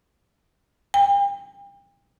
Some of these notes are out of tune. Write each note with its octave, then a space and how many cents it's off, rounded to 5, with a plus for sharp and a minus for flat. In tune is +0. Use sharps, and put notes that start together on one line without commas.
G5 +40